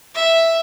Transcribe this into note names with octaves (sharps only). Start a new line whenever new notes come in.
E5